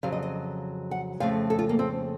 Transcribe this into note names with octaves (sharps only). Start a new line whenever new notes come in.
F2 C#3 F#3 F5
D#5
D#5
F#5
F2 C#3 A3 F5
A4
F4
A#3
C4